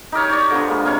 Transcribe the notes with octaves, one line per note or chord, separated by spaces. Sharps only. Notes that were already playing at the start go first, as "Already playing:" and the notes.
D#4 G4 A#4 C#5
C#5 D5
D3 F3 B3
G#3 A#3
C3 A#4 C#5 F5